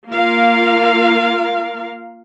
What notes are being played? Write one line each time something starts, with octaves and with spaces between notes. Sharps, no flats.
A#3 F4 A#4 F5